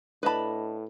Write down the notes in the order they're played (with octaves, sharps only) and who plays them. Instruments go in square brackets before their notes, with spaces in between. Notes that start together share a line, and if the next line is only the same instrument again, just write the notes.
[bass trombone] A2 [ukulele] D4 D#5 A5 [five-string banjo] B4 B5